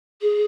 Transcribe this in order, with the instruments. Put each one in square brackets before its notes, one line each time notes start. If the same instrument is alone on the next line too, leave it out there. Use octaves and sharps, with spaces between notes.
[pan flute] G#4